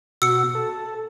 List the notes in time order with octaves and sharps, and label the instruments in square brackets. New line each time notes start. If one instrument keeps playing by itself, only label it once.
[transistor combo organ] B2 F#4 [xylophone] E6 C#7
[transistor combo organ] A4